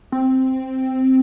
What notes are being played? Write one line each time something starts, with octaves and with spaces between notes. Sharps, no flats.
C4